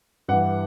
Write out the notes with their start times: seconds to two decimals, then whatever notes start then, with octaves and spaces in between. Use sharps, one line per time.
0.28 G2 E3 F#5